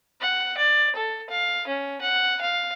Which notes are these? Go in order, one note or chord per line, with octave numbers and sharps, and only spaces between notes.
F#5
D5
A4
F5
C#4
F#5
F5